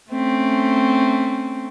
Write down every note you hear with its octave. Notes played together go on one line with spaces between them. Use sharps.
A3 C4 C#4